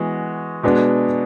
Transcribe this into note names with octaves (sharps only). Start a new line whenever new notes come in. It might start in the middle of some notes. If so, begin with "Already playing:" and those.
Already playing: E3 G#3 B3 F#4
B2 G#3 B3 D4